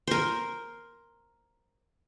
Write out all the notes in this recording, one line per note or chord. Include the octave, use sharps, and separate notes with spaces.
A#4 C5